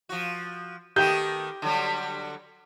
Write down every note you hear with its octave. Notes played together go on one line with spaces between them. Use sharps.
F3 F#4
D#3 A3 B3 G4 G6
D3 F#3 G3